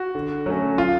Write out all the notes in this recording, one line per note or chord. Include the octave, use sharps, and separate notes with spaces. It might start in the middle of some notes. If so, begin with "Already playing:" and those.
Already playing: F#4
D3
F#3 A3 C#4
F4